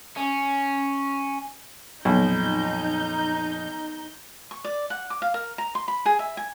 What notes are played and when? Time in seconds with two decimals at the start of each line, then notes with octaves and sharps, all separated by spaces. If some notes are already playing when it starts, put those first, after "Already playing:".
0.17 C#4
2.05 B1 F2 A#2 D#4 G6
4.51 C#6
4.64 D5
4.90 F#5
5.10 D6
5.22 F5
5.34 A#4
5.58 A#5
5.75 C6
5.88 B5
6.06 G#4
6.19 E5
6.37 G#5